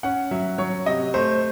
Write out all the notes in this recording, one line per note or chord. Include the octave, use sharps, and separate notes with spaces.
C#4 F#5
F#3 E5
F#3 C#5
C3 D#5
A3 C5